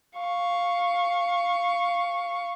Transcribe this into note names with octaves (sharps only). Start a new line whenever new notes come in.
F5 C#6